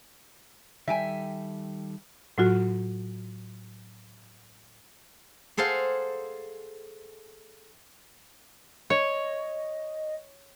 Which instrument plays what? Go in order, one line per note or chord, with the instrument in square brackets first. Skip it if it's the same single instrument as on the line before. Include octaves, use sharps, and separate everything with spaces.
[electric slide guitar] D#3 G3 A4 [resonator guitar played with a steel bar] E5 G5 G#5
[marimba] A2 F#3 F4 F#4
[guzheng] G#4 A4 C5 F5 F#5
[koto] C#5 [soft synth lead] D#5